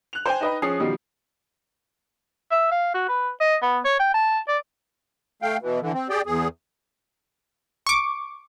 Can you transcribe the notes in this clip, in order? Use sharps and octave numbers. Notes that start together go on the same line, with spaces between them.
F#6 F7
C5 G5 G#5
D#4 B4 D#5 G5 B5
F3 C#4 G#4 D#6 C7
B2 D#3 F3 G3
E5
F5
F#4
B4
D#5
B3
C#5
G5
A5
D5
A3 F5 G5
B2 E3
D3 E3
C4
G4 G#4 D5 G5
E2 G#4
C#6 D6